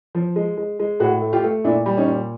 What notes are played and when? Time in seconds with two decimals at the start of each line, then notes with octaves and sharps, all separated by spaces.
0.15 F3
0.36 G#3
0.58 G#3
0.80 G#3
1.00 A2 F#4 G#4
1.22 A3
1.33 F4 G4
1.44 A3
1.64 A#2 D4 E4
1.86 G3
1.97 C#4 D#4
2.07 A#2